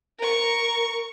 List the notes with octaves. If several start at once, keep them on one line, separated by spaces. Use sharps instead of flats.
A#4 C#6